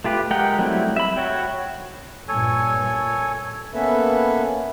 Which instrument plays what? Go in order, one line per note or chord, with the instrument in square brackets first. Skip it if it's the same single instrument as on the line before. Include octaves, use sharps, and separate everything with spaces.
[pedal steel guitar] A3 F4 G4 B4
G#3 G4 A#4 F#5 G5
F#3 G3 A3 C4 E4
E5 B5
F#4 C#5 G5
[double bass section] G2 A#2 [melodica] A4 C#5 G#5
[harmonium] A#3 B3 C#4 A4 B4 E5